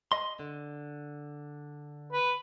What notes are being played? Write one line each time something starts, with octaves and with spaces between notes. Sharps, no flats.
D#5 C6
D3
B4